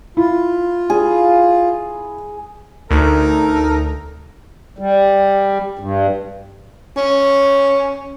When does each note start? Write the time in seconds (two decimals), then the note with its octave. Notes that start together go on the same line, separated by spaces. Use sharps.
0.17 E4 F4
0.90 G#4
2.91 D2 D#4 A4 A#4
4.79 G3
5.79 G2
6.97 C#4